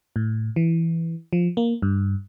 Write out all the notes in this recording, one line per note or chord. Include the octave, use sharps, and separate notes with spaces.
A2
E3
F3
A#3
G2